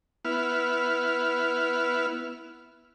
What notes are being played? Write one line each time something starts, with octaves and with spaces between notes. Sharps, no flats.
B3 E4 F6